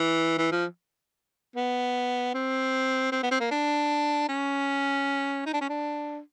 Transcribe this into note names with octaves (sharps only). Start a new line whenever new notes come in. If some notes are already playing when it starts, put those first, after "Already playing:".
Already playing: E3
E3
F3
B3
C4
C4
B3
C4
A#3
D4
C#4
D#4
D4
C#4
D4